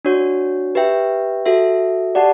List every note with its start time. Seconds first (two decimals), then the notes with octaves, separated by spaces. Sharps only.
0.05 D4 F#4 C#5
0.75 G4 B4 E5 G5
1.46 F#4 A4 E5
2.15 G4 D5 F#5 A5